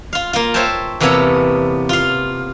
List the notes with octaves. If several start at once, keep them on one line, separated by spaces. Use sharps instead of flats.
F4 F5
A#3 F4
C5 C#5 E5 G5 A5
E2 C3 A#3 B3 A4 C#5
F4 F5